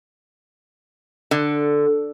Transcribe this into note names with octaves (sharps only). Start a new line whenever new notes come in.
D3